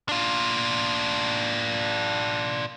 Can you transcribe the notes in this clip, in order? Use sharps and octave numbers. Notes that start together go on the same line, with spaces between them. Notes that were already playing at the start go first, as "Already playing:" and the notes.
D4 F4